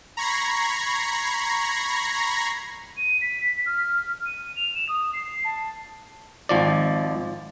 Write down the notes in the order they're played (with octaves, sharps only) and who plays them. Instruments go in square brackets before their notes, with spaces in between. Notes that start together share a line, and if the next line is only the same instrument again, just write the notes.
[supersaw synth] A#5 B5 C#6 G#6 A#6 C7
[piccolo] D#7
B6
F6
D#7
F7
E7
D#6
C7
A5
[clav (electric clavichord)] G#1 F3 D5